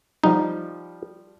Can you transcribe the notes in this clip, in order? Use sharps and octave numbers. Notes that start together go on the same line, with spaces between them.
F3 G3 D#4